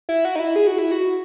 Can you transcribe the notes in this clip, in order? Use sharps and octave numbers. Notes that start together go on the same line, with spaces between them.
E4
F#4
D#4
E4
G#4
F#4
E4
F#4